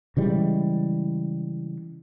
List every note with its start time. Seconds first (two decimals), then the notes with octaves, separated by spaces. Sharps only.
0.17 C#3 E3 G3 G#3